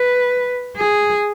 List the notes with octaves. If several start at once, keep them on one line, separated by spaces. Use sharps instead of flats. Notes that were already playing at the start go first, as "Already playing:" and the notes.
Already playing: B4
G#4